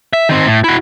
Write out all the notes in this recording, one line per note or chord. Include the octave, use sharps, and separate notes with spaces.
E5
D#3 C4
A2
E4 F#4